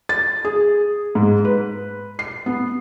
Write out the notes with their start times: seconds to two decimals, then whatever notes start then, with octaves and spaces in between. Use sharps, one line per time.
0.09 A6
0.45 G#4
1.15 G#2
1.45 B4
2.19 C7
2.46 B3